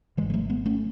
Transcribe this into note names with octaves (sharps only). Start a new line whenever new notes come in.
G#1 F#2 D3 E3 G#3
G#3
F#3 A3
G#3 B3
A3 C#4